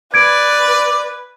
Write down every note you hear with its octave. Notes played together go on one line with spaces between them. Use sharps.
B4 D5 G#6 D7